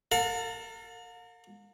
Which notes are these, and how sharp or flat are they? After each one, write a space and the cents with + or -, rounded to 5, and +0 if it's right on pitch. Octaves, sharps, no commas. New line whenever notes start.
A#4 -40 F5 +45 A5 +0